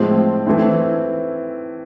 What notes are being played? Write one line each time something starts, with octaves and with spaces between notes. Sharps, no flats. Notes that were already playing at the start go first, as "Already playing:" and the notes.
Already playing: A2 F3 G#3 C4
E3 A3 C4 E4